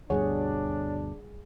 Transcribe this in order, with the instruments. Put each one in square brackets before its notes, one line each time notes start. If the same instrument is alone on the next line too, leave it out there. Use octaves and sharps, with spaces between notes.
[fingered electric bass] D2 G2 B2 [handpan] G3 G#4 F#5 [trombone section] D4 [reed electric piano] C#5